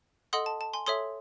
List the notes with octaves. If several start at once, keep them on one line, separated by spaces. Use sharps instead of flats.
A4 D#5 F#5 C6 D#6
A5
A5
G#5 C6
A4 C#5 E5 C6 D#6